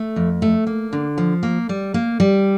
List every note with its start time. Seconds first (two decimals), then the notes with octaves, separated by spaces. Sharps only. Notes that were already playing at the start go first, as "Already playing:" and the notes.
Already playing: A3
0.16 F2
0.42 A3
0.67 A#3
0.93 D3
1.18 F3
1.43 A#3
1.69 G3
1.94 A#3
2.20 G3